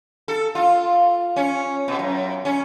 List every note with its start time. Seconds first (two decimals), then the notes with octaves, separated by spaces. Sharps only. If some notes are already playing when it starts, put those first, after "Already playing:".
0.28 A4
0.55 F4
1.36 C#4
1.88 B2
1.99 F#2
2.45 C#4